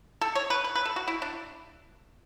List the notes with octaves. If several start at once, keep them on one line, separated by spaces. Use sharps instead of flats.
A4
C#5
B4
B4
B4
A4
F#4
E4
D4